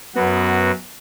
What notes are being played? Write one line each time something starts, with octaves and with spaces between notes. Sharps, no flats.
F#2 B3 F#4